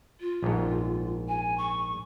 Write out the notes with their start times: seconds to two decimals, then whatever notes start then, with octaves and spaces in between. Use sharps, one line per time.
0.20 F4
0.42 A#1 G#2
1.28 G#5
1.58 C#6